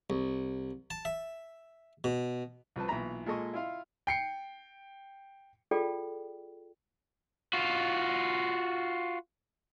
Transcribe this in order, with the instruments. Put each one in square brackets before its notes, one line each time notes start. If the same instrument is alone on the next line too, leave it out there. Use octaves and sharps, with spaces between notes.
[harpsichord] C2
A5
E5
B2
[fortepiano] C2 F3 B4 A5
B1 A#2 E3 E5 A#5 B5
A#2 G#3 A4 D#5 C#6
E4 F4 F5
[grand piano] G5 C7 C#7
[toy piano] F4 G#4 A4 D5 G5
[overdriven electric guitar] F4 F#4